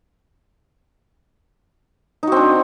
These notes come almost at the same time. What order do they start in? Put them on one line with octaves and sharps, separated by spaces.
D#4 F#4 C4 D4